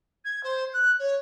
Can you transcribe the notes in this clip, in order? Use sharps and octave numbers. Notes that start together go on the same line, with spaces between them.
G#6
C5
F#6
C#5